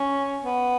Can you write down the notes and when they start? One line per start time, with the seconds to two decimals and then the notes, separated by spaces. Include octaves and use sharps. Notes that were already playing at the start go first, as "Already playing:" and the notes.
Already playing: C#4
0.45 B3